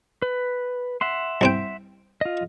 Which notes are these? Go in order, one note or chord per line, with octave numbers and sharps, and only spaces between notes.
B4
E5 F#5 C6
C2 C4 G5
F4 D#5